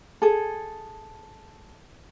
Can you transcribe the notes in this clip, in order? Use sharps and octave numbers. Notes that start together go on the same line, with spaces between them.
G#4 A4